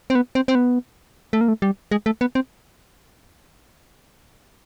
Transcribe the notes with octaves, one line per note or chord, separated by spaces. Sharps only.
C4
B3
C4
C4
B3
A3
A#3
A3
G3
G#3
A3
B3
C4